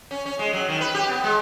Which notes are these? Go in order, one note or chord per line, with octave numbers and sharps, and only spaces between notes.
C#4
C#4
G#3
F#3
D#3
B4
G4
B3
G#3